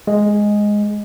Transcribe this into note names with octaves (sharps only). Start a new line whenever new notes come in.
G#3